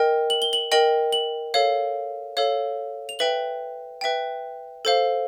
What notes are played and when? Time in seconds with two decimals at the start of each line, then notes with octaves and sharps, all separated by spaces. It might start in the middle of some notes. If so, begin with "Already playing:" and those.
Already playing: A#4 D#5 G5
0.30 F#7
0.42 G7
0.53 F#7
0.72 A#4 D#5 G5 F#7
1.13 F#7
1.54 A4 C#5 F5
2.37 A4 C#5 F5
3.09 F7
3.19 B4 E5 G5 F#7
4.01 B4 E5 G5
4.85 A4 C5 F5